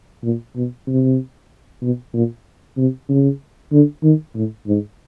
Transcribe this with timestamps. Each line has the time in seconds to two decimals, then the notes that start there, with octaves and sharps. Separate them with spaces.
0.24 A#2
0.56 B2
0.87 C3
1.82 B2
2.14 A#2
2.77 C3
3.09 C#3
3.72 D3
4.03 D#3
4.35 A2
4.67 G#2